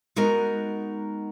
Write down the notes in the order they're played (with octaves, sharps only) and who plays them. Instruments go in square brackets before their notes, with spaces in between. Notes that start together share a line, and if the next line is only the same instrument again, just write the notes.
[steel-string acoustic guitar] G#3 B3 D#4 F#4 A#4